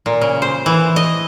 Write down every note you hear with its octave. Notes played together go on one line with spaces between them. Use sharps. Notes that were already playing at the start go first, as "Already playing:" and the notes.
A#2
C#3
C5
E3
D#5